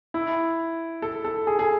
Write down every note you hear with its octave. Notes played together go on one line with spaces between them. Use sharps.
E4
A4
A4
G#4
G#4